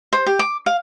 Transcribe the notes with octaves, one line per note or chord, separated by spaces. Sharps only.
C5
G4
D6
F5